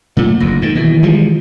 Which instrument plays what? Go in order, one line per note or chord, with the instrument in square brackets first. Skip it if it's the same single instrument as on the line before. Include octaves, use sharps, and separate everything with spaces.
[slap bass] A#2 A3 [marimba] F#3 A#3 F4
[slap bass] F#1 D2 [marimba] A#6
[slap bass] G#2 D#3
[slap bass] B2 [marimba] D#3 E3 E4
[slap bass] F3 G3 G#3 [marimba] F4